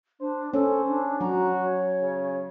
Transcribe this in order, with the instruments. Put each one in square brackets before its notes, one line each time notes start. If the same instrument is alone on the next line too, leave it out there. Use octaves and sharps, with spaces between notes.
[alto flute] D4 [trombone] C5
[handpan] C#4 [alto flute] A4 [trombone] C5
[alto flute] D4
[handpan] F#3 [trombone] F#4 [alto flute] A#5
[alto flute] C#5
[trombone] C#3